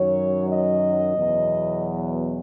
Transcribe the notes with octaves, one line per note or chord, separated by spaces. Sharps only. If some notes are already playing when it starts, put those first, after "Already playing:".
Already playing: F#2 D#3 F#3 C#5
D#5
E2 B2 F#3